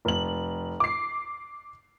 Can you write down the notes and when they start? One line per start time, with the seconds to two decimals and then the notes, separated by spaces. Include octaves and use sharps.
0.05 F1 F#7
0.80 D6 C7